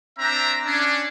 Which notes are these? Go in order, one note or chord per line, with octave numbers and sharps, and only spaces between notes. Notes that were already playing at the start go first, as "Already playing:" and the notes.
C4 D4 E5 A#5
C#4 D4